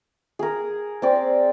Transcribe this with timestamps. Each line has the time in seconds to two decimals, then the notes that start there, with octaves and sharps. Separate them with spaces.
0.39 G#4 A#4
1.02 C4 D5